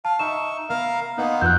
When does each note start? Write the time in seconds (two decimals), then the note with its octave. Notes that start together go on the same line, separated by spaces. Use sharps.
0.05 F5 A5
0.19 D#4 E5 C#6 E7
0.69 B3 A#4 F5
1.18 A#3 B3 D#4 C5 F#5
1.41 F2 F#4 E6 F#6 G6